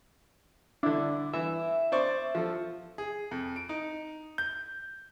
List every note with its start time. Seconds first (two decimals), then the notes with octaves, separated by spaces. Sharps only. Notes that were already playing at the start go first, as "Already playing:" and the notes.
0.83 D3 D4 E4
1.33 E3 E5
1.92 C5 D5 C#6
2.35 F3 A4
2.98 G#4
3.31 F2
3.56 D7
3.69 D#4
4.38 G6